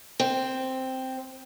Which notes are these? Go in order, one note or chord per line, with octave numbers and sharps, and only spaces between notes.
C4